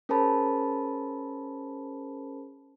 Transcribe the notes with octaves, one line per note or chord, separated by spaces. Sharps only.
C#4 G#4 A#4 C5 A5 B5